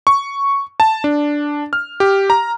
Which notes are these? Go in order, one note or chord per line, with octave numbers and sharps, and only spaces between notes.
C#6
A5
D4
F6
G4
A#5